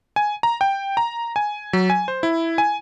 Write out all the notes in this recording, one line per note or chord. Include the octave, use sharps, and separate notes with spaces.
G#5
A#5
G5
A#5
G#5
F#3
G#5
C5
E4
G#5